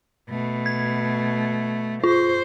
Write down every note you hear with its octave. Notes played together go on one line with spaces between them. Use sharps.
B2 A3
G#6
F4 C5